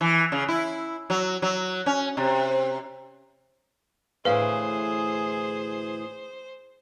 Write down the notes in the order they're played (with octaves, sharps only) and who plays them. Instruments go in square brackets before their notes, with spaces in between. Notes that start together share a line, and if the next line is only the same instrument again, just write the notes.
[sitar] E3
C#3
E4
F#3
F#3
C#4
C3
[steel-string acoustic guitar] D2 A2 E3 [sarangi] G#4 [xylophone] B4 F5 [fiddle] C5